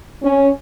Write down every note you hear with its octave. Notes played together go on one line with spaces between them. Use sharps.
C#4